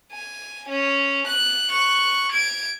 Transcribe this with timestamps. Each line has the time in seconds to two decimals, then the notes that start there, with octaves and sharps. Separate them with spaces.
0.13 G#5
0.69 C#4
1.27 F#6
1.69 C#6 F#6
2.32 G#6 D7